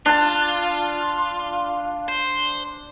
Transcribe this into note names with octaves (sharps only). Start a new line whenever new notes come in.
D4 F4 A5
C5